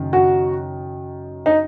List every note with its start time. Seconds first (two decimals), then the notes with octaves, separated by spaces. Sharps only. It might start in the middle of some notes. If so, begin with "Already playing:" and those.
Already playing: F#1 F#2 D#3
0.13 F#4
1.46 D#4